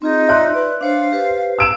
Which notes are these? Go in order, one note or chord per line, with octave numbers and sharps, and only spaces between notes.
C4 D#4 F4 G#4
F4 C#5 D5 E5 C6 F#6
B4 D5
D4 C5 C#5 F5
G4 B4 C5
E6 D7 E7